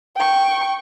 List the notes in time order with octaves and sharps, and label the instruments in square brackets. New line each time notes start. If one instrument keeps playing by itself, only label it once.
[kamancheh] G5 C#6